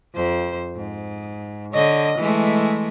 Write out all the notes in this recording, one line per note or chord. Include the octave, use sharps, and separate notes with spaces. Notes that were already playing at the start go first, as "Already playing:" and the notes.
F2 C5
G#2
D3 C#5 D#5
E3 G#3 A3